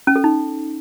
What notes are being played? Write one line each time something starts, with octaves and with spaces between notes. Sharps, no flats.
C#4
A4
D#4